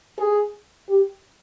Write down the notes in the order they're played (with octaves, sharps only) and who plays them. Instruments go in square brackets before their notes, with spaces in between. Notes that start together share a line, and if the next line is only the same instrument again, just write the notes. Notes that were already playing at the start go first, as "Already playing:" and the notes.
[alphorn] G#4
G4